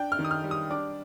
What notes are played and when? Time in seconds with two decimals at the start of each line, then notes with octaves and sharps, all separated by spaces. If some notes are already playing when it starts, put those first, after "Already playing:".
Already playing: D4 G5
0.12 F6
0.19 D#3
0.25 D#6
0.31 F6
0.44 G3
0.51 D#6
0.71 D4 D6